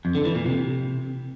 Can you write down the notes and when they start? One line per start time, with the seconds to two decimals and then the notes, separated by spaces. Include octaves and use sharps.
0.05 F2
0.15 D3
0.25 E3
0.35 A#2
0.45 C3